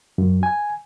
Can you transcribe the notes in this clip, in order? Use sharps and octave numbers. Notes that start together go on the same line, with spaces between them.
F#2
G#5